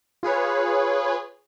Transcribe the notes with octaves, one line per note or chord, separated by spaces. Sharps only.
F4 G#4 B4 C#5